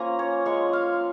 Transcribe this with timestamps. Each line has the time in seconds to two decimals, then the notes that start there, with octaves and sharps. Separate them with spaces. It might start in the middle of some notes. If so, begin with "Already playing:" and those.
Already playing: F3 A#3 C#4 F4 G#5 A#5 C#6
0.19 C#5
0.46 G#3 C#4 F4 C#6
0.73 F5